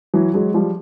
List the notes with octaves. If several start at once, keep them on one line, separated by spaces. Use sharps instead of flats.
E3 F#3
F#3 G#3
F3 G3